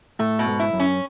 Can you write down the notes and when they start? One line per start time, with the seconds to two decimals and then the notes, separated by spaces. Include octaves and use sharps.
0.19 A2 A3
0.39 B2
0.47 G#2
0.59 E4
0.73 F#2
0.80 C#4